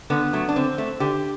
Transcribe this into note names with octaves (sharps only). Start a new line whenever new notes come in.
D3 B3
F#3 A3
D4
D3 C4
A3
D3 G4